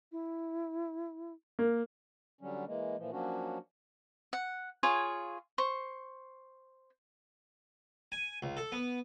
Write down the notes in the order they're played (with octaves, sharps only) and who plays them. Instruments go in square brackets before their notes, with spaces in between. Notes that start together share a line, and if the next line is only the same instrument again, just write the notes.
[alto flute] E4
[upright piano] A#3
[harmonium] D3 F#3 G3 C#4
E3 G#3 A#3
A#2 E3 F3
F3 F#3 A#3 C#4 D4 F#4
[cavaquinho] F#5
F4 G#4 C#5
C5 C#6
[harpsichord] G#5
C#2
A4
B3